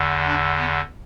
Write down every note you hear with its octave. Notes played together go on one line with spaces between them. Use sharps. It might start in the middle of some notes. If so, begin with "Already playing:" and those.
Already playing: E2 D3
D4
B3